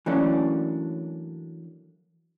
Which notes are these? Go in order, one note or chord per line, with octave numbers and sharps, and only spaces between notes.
E3 F#3 A3 A#3 C#4 D4